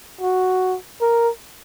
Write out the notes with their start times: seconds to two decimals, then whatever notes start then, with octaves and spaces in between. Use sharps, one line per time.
0.21 F#4
1.01 A#4